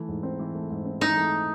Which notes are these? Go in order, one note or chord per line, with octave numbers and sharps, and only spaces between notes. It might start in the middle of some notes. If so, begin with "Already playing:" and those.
Already playing: E3 A3
G#2
C4
E3
A3
G#2
C4
E3 D#4
A3